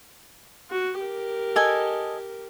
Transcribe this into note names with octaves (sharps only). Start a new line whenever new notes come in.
F#4
G4 A#4
A4 D#5 G#5